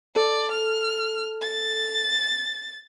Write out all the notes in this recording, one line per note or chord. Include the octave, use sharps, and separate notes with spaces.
A4 D5
F6
A6